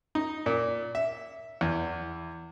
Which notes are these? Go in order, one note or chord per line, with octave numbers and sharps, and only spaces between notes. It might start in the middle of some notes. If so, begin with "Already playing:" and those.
D#4
A#2
E5
E2